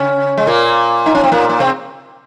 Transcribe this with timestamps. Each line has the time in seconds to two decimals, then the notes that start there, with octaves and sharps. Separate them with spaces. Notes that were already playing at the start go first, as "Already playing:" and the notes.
Already playing: C#3 C#4
0.37 G#3
0.47 A#2 A#3
1.06 D#4
1.15 C#4
1.24 C4
1.32 A#2 A#3
1.49 A#3
1.60 C3 C4